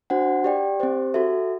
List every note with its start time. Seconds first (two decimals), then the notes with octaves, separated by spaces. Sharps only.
0.10 D4 F#4 C5 F#5
0.44 G4 D5 G5
0.80 C4 G4 C5
1.14 F#4 A4 E5